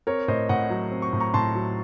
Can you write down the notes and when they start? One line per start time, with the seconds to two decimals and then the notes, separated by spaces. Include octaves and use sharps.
0.07 C4 A#4 C#5
0.28 A2 C5 D#5
0.49 A2 D#5 F#5
0.70 F#3
0.91 C4
1.02 C#6
1.13 A2
1.20 A#5 C#6
1.34 A2 A5 C6
1.55 F#3